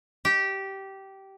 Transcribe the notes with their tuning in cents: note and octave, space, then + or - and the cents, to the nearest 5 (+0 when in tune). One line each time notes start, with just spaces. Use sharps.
G4 -15